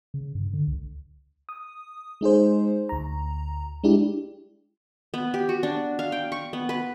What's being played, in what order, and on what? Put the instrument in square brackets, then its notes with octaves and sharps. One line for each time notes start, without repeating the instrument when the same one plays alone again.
[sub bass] C#3
G2
D3
C#2
[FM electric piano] D#6
G#3 D#4 G#4 C5
D2 A#5
G#3 D4 E4 G4
[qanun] B3
G4
F#4
D4
F5
G5
C#6
B3
B4